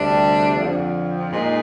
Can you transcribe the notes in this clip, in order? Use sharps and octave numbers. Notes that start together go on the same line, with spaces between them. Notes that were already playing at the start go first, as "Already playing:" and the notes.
Already playing: D2 C3 G3 D4
F2 D3 F3 C4
A#2 G#3 D#4